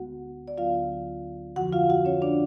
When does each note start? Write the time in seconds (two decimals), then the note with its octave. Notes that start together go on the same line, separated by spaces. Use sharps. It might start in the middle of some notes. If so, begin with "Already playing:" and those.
Already playing: D2 D3 G#3 B3 F#4 F#5
0.48 D5
0.58 D2 D3 F#3 B3 F4 F5
1.56 F2 D3 F3 F#4 F#5
1.73 F4 F5
1.90 F#4 F#5
2.05 C#4 C#5
2.22 D4 D5